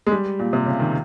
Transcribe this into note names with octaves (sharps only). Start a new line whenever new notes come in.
G#3
G3
A#2
C3
C#3
D#3